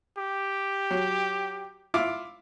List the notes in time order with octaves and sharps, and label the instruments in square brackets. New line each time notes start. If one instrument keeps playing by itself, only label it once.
[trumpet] G4
[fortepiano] F#3
E4 F4 D6